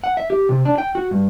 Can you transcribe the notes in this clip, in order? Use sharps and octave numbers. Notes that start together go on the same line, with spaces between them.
F#5
E5
G4
C3
D4
G5
F#4
G2